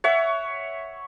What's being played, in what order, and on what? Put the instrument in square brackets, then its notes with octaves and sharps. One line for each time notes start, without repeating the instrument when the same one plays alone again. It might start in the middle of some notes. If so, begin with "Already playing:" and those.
[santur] C#5 E5 F#5